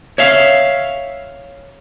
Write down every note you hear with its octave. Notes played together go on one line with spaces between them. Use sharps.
C#5 E5 F5